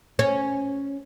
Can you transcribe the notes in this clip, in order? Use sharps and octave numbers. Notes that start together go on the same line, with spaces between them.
C#4